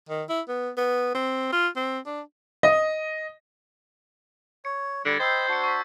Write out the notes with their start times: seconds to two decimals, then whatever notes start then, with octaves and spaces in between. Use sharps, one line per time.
0.09 D#3
0.29 E4
0.48 B3
0.77 B3
1.15 C4
1.52 F4
1.76 C4
2.06 D4
2.63 D#5
4.65 C#5 C#7
5.05 D3 G3 G#6 A6 C#7
5.20 C5 D#5 G5 B5 E6 G6 C7
5.49 D4 F#4 C7 C#7
5.64 C#6 B6